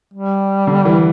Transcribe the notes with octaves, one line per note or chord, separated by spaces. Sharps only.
G3
D3
E3